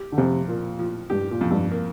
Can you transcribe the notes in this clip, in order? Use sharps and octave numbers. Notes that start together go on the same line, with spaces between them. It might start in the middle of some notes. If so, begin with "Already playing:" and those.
Already playing: G4
D3
F2 C3
A#2 A#3
F3
G2 G4
A#2
F2
G2
A#3